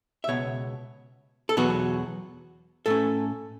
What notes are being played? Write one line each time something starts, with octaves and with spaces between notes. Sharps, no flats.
E5
C#2 B2 B3 C#5
A4
E2 B2 F#3 B3 F#4
A2 A3 C#4 A4